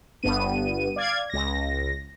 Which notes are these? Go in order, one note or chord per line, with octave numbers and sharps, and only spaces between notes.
G1 G2 B3 D#7
D5 F5 G#6
C#2 A#6